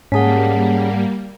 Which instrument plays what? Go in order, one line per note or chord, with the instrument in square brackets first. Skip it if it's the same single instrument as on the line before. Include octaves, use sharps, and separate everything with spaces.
[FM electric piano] G#2 [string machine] G3 A#3 [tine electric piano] C#4 G#4 [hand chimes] F#5 A5 B6